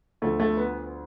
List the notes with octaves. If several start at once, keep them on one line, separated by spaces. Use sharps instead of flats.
D2 D3 F3 A3
A3
B3